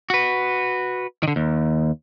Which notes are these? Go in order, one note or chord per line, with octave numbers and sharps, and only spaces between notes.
F#4 B4
D3 D#3
D#2